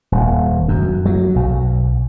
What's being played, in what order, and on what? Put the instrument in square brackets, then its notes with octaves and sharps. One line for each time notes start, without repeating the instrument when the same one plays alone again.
[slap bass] D#1
F#2
F#3
B1